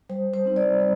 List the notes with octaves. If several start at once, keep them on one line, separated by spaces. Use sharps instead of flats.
G3 C5
C5
C4 D#4
D5
G3